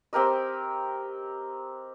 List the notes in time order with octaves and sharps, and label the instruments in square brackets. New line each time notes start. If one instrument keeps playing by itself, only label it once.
[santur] C4 G4 A#4 D#5